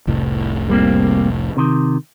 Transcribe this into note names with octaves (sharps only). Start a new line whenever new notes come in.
F1 C2 A2
G3 A#3 C4
C3 D#3